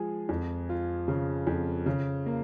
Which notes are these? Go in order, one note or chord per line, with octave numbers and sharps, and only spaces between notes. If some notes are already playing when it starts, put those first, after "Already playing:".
Already playing: F3 G#3 G#4
F2
F4
C#3
F2
C#3
A#3